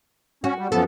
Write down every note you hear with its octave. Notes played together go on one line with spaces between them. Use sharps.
C#4 F#4
G3
F#2 F3 B3 A4